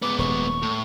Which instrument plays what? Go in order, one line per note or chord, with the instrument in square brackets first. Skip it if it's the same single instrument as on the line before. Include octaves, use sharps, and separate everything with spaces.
[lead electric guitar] G#2 B3 [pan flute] D6
[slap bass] D#1 [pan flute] C#6
[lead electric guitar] A2